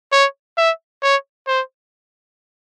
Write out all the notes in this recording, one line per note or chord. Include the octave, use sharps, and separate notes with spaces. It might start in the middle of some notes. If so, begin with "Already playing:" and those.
C#5
E5
C#5
C5